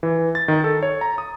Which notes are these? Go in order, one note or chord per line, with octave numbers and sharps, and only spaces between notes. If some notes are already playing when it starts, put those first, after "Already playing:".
E3
A6
D#3
A4
C#5
A#5
D#6